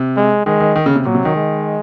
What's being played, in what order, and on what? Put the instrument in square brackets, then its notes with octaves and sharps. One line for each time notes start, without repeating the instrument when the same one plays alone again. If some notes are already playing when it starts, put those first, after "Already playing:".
Already playing: [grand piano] C3
[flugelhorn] G#3
[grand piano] D#3 [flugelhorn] G#3
[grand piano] D#3
D#3
C#3
C3
[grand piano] A#2 [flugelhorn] F#3
[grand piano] C3
D#3
[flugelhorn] G#3